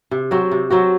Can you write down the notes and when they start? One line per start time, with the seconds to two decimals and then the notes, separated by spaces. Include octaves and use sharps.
0.11 C3
0.31 F#3 C4 F#4
0.51 C3
0.70 F#3 C4 F#4